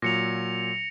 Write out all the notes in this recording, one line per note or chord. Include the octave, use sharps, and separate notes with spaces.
A#2 F#3 A#6 C#7 F7